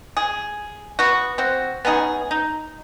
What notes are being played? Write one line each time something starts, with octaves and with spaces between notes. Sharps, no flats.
G#4
B3 F#4
C4 F#4
B3 C#4 D#4 G#4
D#4